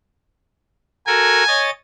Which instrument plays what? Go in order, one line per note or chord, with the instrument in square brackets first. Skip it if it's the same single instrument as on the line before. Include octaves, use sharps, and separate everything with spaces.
[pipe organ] F#4 A4 A#4 [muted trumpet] G#5
[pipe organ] C#5 D#5 A6